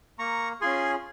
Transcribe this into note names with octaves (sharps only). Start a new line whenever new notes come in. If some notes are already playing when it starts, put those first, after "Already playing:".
A#3 A#5 C#6
C#4 F4 G#4 G#5 C6